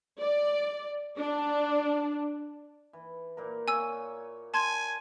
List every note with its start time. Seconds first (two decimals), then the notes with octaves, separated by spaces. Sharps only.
0.21 D5
1.17 D4
2.93 E3
3.37 A#2 A#3 A#4
3.68 C#5 F5 G#5 E6
4.54 G#5 A5 C6 G#6